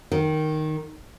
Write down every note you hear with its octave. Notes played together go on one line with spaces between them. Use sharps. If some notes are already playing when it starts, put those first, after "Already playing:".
D#3